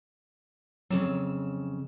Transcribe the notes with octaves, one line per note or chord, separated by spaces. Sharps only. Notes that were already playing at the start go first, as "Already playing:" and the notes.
F2 A#2 C#3 F#3 C#5 E7